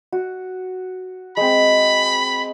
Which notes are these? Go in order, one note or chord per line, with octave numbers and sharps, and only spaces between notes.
F#4
G#3 C4 B5